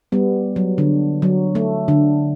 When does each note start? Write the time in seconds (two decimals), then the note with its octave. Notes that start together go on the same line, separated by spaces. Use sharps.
0.12 G3 B3
0.56 F#3
0.78 D3
1.22 F#3
1.55 A3
1.88 D3